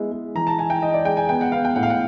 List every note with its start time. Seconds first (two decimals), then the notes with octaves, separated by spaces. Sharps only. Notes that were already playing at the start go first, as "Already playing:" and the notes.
Already playing: G#3 B3 E4
0.12 G#3
0.35 E3 A#5
0.47 A5
0.59 E4 G#5
0.70 G5
0.82 E4 D#5
0.94 D5
1.05 G#3 G5
1.17 G#5
1.29 B3 G5
1.41 F#5
1.52 B3 F5
1.65 G5
1.76 A2 F#5
1.83 F5
1.90 F#5